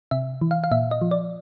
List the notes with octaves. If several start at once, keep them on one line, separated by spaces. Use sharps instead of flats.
C3 E5
E3
F5
F5
A#2 E5
D#5
F3
D5